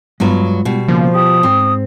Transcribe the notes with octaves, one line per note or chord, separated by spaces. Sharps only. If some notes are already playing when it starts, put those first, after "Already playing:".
G2 F#3 G#3 B3 F4 B5
B2 G3
C#3 F3 A#3
G4 D#6
G#2 C4